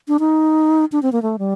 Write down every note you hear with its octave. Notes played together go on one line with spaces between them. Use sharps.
D4
D#4
D4
C4
A#3
A3
G3